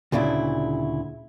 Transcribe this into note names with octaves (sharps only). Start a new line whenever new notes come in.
D2 A#2 C#3 D4 E4